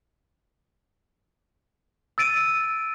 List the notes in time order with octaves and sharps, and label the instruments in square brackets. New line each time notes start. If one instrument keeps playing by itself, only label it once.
[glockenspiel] E6 A6 D7 D#7